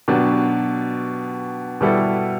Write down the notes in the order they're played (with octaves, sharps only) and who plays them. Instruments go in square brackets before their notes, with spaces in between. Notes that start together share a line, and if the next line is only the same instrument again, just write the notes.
[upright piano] B2 F#3 B3 D4 G4
B2 G3 B3 E4 A4